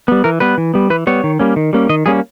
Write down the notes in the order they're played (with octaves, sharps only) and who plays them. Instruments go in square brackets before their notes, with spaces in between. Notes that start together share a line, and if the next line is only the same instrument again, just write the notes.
[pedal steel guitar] G3 B3
E3 A#4
G3 B3 B4
E3
G3 B3
E3 B4
G3 B3 C#5
D#3
G3 A#3 C#4
D#3
G3 A#3 C#4
D#3 D#5
G3 A#3 C#4 G#4